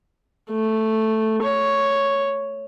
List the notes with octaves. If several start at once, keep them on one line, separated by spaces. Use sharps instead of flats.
A3
C#5